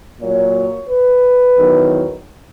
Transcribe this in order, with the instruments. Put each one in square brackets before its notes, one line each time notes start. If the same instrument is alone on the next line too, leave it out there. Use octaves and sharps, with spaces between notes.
[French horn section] A#2 F#3 C#5
B4
E2 D#3 F#3